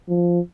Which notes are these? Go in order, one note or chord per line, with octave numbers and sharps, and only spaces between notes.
F3